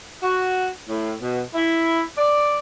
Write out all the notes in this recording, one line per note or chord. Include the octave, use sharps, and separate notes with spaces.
F#4
A2
B2
E4
D5